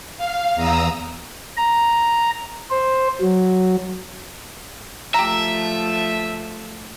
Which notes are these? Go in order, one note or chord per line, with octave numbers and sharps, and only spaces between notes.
F5
E2 A#5 D#6 E6
A#5
C5
F#3
F3 A3 G4 E5 A#5